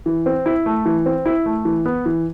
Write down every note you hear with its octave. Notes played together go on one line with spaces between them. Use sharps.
E3
C4
E4
A3
E3
C4
E4
A3
E3
B3
E3